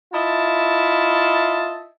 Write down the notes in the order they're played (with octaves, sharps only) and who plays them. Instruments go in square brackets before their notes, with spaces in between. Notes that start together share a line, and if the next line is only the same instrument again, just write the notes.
[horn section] E4 F4 D#5 E5 A5